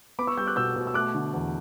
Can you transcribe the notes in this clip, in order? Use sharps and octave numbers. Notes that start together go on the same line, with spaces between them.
B3 B5 D6
C#6 E6
G3 E6 G6
D6 F#6
B2 E6 G6
B2
E6
A3 D6 F#6
D3
E2